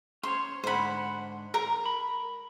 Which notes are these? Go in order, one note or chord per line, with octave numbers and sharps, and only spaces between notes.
C#4 C5 C#5 C6
G#2 D3 C5 F#5 B5
A#4 A#5
B5